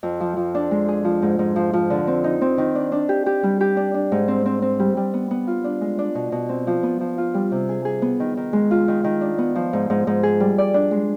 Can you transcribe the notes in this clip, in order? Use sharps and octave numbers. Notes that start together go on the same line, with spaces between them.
F2
F3
F3
D4
G#3
G#4
F3
G#2
G#2
F3
F3
D3
C4
D#4
C4
D#3
D4
D4
G4
G4
G3
G4
D4
D4
G#2
C4
C4
C4
G3
G3
B3
B3
F4
D4
G#3
D4
B2
B2
C4
F3
B3
F3
F4
G3
C3
G#4
G#4
B3
D#3
D#3
G#3
F4
D#3
D#3
D4
B3
F3
G#2
G#2
G#2
G#4
G3
D5
D4
G#3